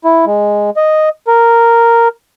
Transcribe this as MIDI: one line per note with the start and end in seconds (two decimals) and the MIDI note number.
0.04 0.25 64
0.26 0.70 56
0.76 1.09 75
1.27 2.08 70